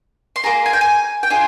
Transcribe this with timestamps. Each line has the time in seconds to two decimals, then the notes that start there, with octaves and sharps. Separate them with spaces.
0.36 C6
0.44 A#3 F4 G#4 A#5
0.66 G#5
0.73 G5
0.81 G#5
1.23 G5
1.30 D4 F4 G#4 G#5